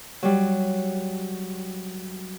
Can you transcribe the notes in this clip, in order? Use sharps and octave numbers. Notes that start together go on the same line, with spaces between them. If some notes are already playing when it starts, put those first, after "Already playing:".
F#3 G3